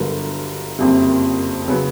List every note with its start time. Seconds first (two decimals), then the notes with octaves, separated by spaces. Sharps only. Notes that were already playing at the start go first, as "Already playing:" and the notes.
Already playing: G1 G2 D3 F#3 B3 A#4
0.79 F#1 F2 C3
1.68 C#3 F#3 B3